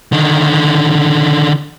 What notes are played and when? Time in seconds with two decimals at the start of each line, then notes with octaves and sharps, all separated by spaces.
0.12 D3 D#3